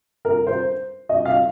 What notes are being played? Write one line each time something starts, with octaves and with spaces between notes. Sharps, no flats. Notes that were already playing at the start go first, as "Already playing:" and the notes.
A#4
C5
D#5
F5